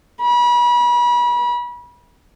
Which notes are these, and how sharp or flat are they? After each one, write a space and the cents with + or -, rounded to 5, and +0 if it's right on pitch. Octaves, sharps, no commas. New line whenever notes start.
B5 -35